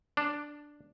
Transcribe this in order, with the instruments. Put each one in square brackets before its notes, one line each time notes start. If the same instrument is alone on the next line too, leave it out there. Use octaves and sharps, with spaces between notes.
[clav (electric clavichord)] D4